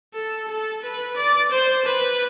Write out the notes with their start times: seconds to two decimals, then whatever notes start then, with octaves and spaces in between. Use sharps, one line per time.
0.14 A4
0.48 A4
0.82 B4
1.16 D5
1.51 C5
1.85 B4